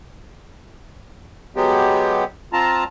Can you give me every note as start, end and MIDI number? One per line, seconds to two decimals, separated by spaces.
1.56 2.24 54
1.56 2.24 56
1.56 2.24 59
1.56 2.24 67
2.53 2.84 60
2.53 2.84 65
2.53 2.84 81
2.53 2.84 82